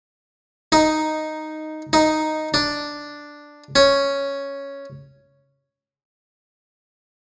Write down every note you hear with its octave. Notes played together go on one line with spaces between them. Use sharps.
D#4
D#4
D4
C#4